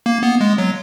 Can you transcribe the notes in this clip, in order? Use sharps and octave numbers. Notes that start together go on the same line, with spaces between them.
A#3
B3
G#3
F#3